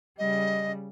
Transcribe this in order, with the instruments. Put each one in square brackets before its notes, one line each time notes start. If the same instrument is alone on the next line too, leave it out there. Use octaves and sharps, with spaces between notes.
[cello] C#3 G3 [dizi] D#5